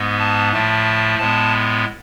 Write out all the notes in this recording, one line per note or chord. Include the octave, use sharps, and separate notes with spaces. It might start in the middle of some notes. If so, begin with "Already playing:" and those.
Already playing: G#2 G#3 B3
A5
A2 F3 A3 A5
A2 G#3 B3 A5